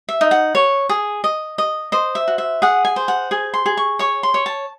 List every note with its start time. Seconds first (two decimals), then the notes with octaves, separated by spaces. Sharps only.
0.09 E5
0.21 D#4
0.31 F#5
0.55 C#5
0.89 G#4
1.24 D#5
1.58 D#5
1.92 C5 D#5
2.15 E5
2.28 F#4
2.38 E5
2.62 G#4 F#5
2.85 G#5
2.96 C5
3.08 F#5
3.31 G#4 G#5
3.54 C6
3.66 G#4
3.77 C#6
3.99 C#5 C#6
4.23 C6
4.34 C#5
4.46 A5